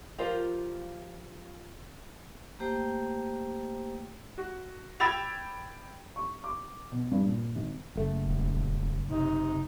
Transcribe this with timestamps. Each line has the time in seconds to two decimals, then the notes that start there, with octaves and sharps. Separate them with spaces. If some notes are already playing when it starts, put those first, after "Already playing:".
0.18 F3 F4 G4 A#4 C5
2.59 A3 A#3 G4 C5 G5
4.38 F#4
5.00 G5 B5 E6 G#6 A6 F7
6.16 C#6
6.44 D6
6.92 B2
7.11 G2
7.25 A#2
7.55 G#1
7.96 F#1 A3
8.25 D#1
9.09 C3 D#4